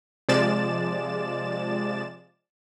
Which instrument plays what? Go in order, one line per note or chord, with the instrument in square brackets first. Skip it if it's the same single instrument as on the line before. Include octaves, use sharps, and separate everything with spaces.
[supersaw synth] C3 F3 G#3 D5 A6 E7